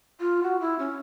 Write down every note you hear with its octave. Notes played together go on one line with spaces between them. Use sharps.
F4
F#4
E4
C#4